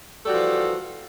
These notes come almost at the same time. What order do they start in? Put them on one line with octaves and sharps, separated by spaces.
A4 G3 F#4 E3 F3